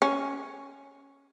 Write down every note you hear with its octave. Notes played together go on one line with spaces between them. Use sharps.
C#4